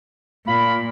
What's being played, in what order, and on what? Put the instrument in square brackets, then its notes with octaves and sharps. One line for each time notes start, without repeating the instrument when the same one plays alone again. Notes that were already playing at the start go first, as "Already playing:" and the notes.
[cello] A#2 [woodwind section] F4 A#4 B5